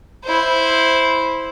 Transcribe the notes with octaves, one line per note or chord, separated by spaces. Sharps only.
E4 C5